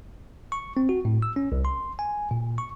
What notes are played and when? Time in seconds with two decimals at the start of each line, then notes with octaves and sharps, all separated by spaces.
0.52 C#6
0.77 C4
0.89 F#4
1.05 A2
1.22 E6
1.36 C#4
1.52 C2
1.65 C6
1.99 G#5
2.31 A#2
2.58 C#6